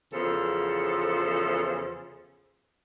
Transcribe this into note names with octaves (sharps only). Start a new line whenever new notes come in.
E2 C#3 F3 A4